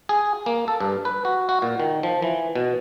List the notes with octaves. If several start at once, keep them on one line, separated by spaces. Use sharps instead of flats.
G#4
A#3
A4
G2
B4
F#4
F#4
A#2
D#3
F3
E3
B2